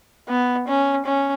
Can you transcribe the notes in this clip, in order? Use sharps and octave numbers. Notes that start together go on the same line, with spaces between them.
B3
C#4
C#4